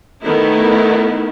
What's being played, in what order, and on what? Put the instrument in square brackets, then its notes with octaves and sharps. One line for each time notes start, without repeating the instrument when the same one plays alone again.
[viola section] D#3 A3 B3 D#4 E4